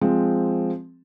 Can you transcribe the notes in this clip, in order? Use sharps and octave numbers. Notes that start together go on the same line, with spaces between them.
F3 G#3 C4